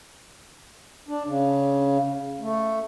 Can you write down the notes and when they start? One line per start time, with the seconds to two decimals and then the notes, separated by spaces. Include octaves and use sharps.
1.08 D4
1.26 C#3
2.41 A3